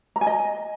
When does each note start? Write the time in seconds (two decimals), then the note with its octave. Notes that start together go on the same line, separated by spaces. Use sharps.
0.16 A#5
0.21 G#5
0.27 D#5